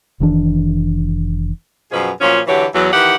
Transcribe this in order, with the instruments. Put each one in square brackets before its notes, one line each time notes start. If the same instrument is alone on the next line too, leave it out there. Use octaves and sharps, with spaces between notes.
[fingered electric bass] F1 D#3 E3 D4
[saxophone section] F#2 B2 F3 G#4 B4
A#2 F3 F#3 C#4
D3 E3 F#3 G4 C#5
E2 E3 F#3
D#3 E3 G4 F#5